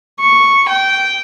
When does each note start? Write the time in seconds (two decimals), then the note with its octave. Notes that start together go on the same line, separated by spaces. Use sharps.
0.20 C#6
0.69 G5